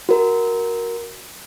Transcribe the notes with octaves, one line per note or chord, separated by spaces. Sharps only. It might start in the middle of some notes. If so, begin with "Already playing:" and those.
F#4 A#4